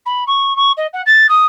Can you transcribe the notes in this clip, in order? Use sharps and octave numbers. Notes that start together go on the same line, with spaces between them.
B5
C#6
C#6
D#5
F#5
A6
D#6